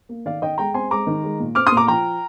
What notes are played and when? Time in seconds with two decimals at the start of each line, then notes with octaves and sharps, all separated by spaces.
0.09 A#3
0.25 D#3 D5 F5
0.42 D#3 D#5 G5
0.58 G#3 G5 A#5
0.74 C4 G#5 C6
0.91 G#3 A#5 D6
1.07 D#3
1.23 G#3
1.39 A#2
1.55 C4 D6 F6
1.66 C6 D#6
1.72 A#2
1.77 A#5 D6
1.87 F3 G5 A#5